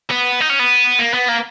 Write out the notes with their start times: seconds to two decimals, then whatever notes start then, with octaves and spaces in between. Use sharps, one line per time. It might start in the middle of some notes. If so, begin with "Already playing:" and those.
0.10 B3
0.40 D#4
0.50 C#4
0.59 B3
0.99 A#3
1.14 B3
1.29 A#3